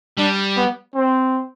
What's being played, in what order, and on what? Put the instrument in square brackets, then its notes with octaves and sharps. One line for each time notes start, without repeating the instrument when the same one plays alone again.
[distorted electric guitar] G3 [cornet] D4
[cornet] B3
C4